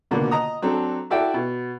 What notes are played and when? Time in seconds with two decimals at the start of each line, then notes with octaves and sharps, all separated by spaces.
0.11 G#1 C#2 B2 D3 A#3
0.31 D#5 A#5 D#6
0.62 F#3 C4 D4 A4
1.10 E4 F#4 A4 D5 E5 G5
1.34 B2